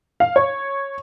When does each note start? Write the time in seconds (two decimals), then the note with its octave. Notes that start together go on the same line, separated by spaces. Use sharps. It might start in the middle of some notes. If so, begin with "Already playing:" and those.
0.20 F5
0.36 C#5